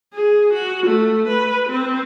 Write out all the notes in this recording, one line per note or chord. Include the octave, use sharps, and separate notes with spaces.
G#4
F#4
A3
B4
C4